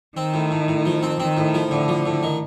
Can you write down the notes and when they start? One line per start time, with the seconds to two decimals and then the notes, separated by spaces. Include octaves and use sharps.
0.17 D#3 C4
0.34 A2
0.51 A2
0.68 A2
0.86 F3
1.03 C4
1.20 D#3 C4
1.37 A2
1.54 F3
1.71 A2 D3
1.88 F3
2.06 A2
2.23 D#3